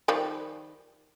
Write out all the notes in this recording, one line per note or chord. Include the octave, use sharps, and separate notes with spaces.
D#3 F3 G3